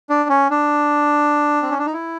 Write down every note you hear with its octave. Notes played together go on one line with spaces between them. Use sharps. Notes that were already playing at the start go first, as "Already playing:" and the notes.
D4
C#4
D4
C4
C#4
D4
D#4
E4